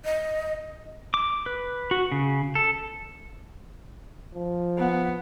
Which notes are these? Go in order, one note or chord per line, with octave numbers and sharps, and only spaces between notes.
D#5
D6
B4
F#4
C#3
A4
F3
B3